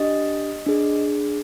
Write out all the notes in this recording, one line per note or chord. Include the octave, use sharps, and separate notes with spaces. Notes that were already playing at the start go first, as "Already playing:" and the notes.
Already playing: D4 G4 D#5
D4 G#4